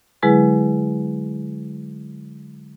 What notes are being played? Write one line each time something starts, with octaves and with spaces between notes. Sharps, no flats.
D3 F#3 G#3 E4 G#4 B4